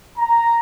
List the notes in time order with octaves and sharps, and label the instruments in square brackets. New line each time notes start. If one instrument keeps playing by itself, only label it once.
[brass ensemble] A#5